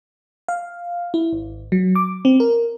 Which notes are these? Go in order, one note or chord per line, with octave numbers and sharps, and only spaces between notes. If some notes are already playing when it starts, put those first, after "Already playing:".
F5
E4
G#1
F#3
D6
C4
A#4